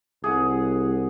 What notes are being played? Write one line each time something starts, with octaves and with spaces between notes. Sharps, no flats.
C2 G#4 F#5